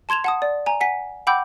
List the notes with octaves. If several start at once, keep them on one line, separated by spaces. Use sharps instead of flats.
A5 C6 G#6 E7 F7
F#5 A5 D#6
D5
G#5 A#5
F#5 G#5 B6
F#5 G5 B5 D6 E6 G6